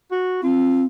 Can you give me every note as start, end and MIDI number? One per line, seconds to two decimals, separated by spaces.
0.11 0.41 66
0.43 0.85 60
0.43 0.83 65